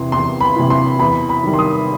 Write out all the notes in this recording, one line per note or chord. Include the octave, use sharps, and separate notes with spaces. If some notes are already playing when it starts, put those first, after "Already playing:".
Already playing: E2 C3 E3 C6
E2 C6
B5
C3 E3
C6
E2 B5
B5
D#3 G3
C6
D#6